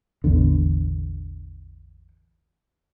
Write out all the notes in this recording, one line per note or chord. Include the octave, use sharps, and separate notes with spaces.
A1 E2 D3